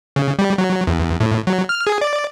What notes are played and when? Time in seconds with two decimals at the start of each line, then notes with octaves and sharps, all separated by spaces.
0.16 C#3
0.39 G3
0.58 F#3
0.87 E2
1.20 A2
1.47 F#3
1.69 F6
1.87 G#4
2.01 D5